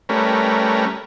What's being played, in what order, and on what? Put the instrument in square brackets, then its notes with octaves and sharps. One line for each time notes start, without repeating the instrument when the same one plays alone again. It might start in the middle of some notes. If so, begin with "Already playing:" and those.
[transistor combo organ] G3 A3 C#4 A#4 B4